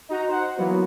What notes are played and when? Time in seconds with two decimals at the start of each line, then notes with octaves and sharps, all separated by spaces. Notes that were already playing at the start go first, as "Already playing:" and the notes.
0.09 D#4 F#4 A#5
0.28 C5 F#5
0.57 E3 F#3 A#3 B3 F#4